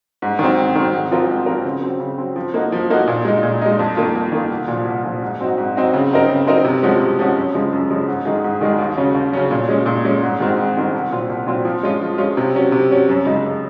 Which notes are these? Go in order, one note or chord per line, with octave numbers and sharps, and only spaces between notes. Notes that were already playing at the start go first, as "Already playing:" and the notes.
G#2
D#3 F#3 C4
G#2
D#3 F#3 C4
G#2
F3 C4 F4 A#4
G#2
F3 C4 F4 A#4
C#3
F#3 C4
C#3
F#3 C4
F3
A#3 D#4 F#4
F3
A#3 D#4 F#4
A#2
G#3 D#4
A#2
G#3 D#4
F2
D#3 A#3 F4
F2
D#3 A#3 F4
C2
A#2 F3
C2
A#2 F3
G#2
F#3 C4 D#4 F#4
G#2
F#3 C4 D#4 F#4
C#3
F#3 C4 D#4 A#4
C#3
F#3 C4 D#4 A#4
C3
F3 G#3 C#4 F#4
C3
F3 G#3 C#4 F#4
F#2
C#3 F3 G#3 C#4
F#2
C#3 F3 G#3 C#4
G#2
D#3 G#3 D#4 G#4
G#2
D#3 G#3 D#4 G#4
D#2
C#3 F#3 C#4
D#2
C#3 F#3 C#4
A#2
G#3 C#4
A#2
G#3 C#4
G#2
D#3 G#3 C4 F#4
G#2
D#3 G#3 C4 F#4
C2
A#2 F#3 C4 F4
C2
A#2 F#3 C4 F4
F3
G#3 C#4 F4
F3
G#3 C#4 F4
C3
F#3 C#4
C3
F#3 C#4
F#2
C#3 G#3 D#4
F#2